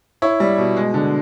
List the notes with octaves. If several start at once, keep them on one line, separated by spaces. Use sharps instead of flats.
E4 C#5
G3
B2
G#3
D3